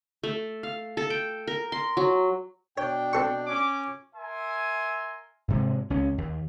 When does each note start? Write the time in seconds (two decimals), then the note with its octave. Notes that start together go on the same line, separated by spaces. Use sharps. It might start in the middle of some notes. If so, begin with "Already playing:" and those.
0.23 A3
0.63 F5
0.97 A4
1.10 G5
1.47 A#4
1.72 C6
1.97 F#3
2.78 B2 D4 C#5 G5
3.13 C4 A4 C#6
3.47 C#4 D6
4.15 A#4 E5 G#5 C6
5.48 G#2 C3 G#3
5.90 C#2 C#4
6.18 D#2